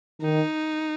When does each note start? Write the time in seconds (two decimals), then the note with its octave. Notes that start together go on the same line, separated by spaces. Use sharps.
0.22 D#3 D#4